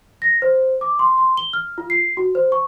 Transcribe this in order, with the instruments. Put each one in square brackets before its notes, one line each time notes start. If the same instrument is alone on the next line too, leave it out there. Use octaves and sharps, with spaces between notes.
[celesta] A#6
C5
D6
C6
C6
G7
F6
F4
C7
F#4
C5
C#6